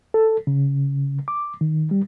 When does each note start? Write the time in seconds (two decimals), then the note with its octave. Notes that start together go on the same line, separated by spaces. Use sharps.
0.14 A4
0.47 C#3
1.28 D6
1.61 D#3
1.91 G3